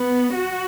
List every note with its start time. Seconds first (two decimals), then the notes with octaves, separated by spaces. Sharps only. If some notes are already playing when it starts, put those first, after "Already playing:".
Already playing: B3
0.35 F#4